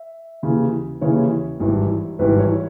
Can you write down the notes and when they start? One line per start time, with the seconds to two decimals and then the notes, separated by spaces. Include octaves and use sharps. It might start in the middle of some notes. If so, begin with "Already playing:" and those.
Already playing: E5
0.43 D#2 C#3 E3
1.01 D#2 C#3 E3 C#5
1.60 G#1 G2 E3
2.19 G#1 G2 E3 B4
2.39 C#5